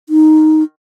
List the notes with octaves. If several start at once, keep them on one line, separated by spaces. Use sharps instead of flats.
D#4